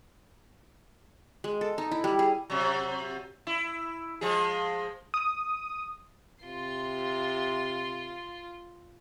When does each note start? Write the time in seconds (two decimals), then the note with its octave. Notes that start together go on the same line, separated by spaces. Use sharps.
1.44 G#3
1.61 A4
1.78 D#4
1.92 E4
2.04 G3
2.19 G#4
2.50 C3 F#3
3.47 E4
4.21 F3 G#3 G#4
5.14 D#6
6.45 C3 F4 C6